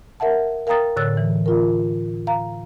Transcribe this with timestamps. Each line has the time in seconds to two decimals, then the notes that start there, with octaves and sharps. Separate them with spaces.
0.20 A#4 E5 F#5 A5
0.67 A#4 F5 G5 A#5 D#6 A6
0.96 A2 D3 C#5 E6 F#6 A6
1.17 E3
1.46 F4 A#4
2.27 F5 A#5